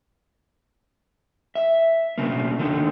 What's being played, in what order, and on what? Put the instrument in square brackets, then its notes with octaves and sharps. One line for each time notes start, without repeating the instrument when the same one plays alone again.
[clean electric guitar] E5
B1 A2 C#3 A#3
D#2 D3 D#3